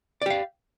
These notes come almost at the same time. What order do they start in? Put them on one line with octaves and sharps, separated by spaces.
D5 G4 F5